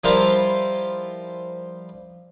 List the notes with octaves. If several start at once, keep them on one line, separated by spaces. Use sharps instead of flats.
F3 G3 E4 F4 A#4 C5